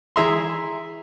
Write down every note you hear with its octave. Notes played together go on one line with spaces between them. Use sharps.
E3 E4 G#4 E5 A#5 C6